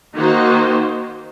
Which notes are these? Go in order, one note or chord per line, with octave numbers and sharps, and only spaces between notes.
D#3 A#3 D#4 F#4 C5